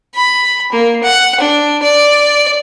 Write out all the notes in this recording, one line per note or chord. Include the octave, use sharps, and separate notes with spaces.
B5
A#3
F#5
D4
D5